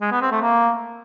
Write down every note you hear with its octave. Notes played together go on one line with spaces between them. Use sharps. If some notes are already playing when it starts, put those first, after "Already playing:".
G#3
B3
C4
A3
A#3